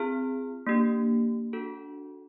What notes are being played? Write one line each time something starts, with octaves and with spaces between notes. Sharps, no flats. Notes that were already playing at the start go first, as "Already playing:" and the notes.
Already playing: C4 F4 G#4 F6
A#3 D4 G4
D4 F#4 A4